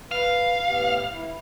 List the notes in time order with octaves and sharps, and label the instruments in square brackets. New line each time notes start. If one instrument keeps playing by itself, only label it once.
[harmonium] B4 [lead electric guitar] F5
[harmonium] A2 B3 G4
E4